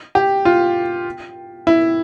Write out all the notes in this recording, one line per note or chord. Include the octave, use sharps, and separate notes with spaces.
G4
F4
E4